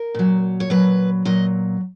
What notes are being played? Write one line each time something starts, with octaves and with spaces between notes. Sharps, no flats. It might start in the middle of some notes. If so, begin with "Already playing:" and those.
Already playing: A#4
A#2 F#3
C#5
A#2 F#3 B4
A#2 F#3 D#5